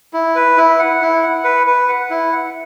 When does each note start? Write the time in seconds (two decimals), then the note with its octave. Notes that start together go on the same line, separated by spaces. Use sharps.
0.13 E4
0.36 B4
0.57 E4
0.79 F#5
1.01 E4
1.23 F#5
1.44 B4
1.67 B4
1.89 F#5
2.10 E4
2.33 F#5